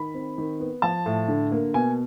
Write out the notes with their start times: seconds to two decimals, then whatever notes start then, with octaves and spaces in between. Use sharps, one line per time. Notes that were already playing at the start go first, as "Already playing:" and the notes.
Already playing: D#3 B5
0.14 C4
0.38 D#3
0.60 B3
0.82 F3 A5
1.06 A2
1.28 D3
1.52 A#3
1.74 B2 G#5